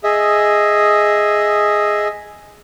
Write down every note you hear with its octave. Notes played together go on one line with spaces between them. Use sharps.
G#4 D#5 E5